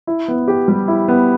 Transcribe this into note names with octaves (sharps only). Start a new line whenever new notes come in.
E4
B3
G4
G3
E4
B3